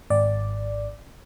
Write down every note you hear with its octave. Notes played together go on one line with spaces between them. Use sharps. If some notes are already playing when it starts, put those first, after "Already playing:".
G#1 D5